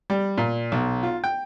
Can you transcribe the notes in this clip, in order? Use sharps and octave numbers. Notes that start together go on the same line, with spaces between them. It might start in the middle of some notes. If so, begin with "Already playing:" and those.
G3
A#2
B1
F4
G5